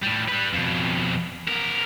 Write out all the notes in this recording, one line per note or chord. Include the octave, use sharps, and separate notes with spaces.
A2 G3
G3 B4
F2 B2
B3 A#4